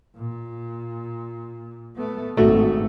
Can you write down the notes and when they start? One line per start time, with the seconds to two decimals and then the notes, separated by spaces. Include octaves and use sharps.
0.16 A#2
1.96 A3 B3
2.37 G#1 A3 F#4